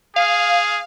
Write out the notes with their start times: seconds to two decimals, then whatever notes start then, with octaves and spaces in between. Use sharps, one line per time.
0.16 G#4 F5